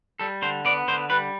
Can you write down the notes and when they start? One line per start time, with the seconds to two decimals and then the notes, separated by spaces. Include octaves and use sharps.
0.19 G3 A4
0.42 D3 C5
0.65 B3 D5
0.88 D3 C5
1.10 G3 B4